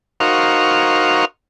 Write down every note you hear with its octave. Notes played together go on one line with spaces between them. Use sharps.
D#4 F#4 A#4 C5 F5 C#6